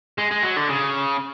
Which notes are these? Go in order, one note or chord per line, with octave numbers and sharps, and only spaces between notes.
G#3
G#3
F#3
D3
C#3